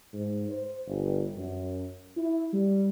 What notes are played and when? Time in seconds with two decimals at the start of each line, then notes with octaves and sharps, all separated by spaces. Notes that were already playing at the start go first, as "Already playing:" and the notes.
0.14 G#2
0.49 C5
0.87 G1
1.36 F#2
2.17 E4
2.53 G3